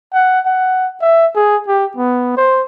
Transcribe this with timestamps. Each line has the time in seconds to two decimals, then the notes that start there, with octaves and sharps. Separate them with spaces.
0.13 F#5
0.46 F#5
1.02 E5
1.36 G#4
1.68 G4
1.97 B3
2.37 C5